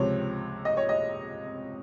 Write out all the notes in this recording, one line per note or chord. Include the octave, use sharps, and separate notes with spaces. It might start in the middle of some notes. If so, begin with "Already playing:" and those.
Already playing: C#2 C3 F3 C4 C#5
D#5
C#5
D#5